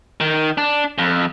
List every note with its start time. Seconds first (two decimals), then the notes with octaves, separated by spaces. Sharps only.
0.21 D#3
0.58 D4
0.98 F2